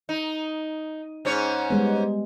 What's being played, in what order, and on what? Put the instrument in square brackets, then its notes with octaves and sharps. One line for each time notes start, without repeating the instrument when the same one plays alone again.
[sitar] D#4
G#2 C#4 C#5
[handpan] G3 G#3 B3